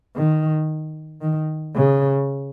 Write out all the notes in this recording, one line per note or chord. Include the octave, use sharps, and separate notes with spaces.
D#3
D#3
C#3